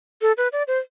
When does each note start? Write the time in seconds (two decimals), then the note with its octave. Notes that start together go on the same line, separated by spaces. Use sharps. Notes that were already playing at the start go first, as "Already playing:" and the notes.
0.22 A4
0.37 B4
0.52 D5
0.68 C5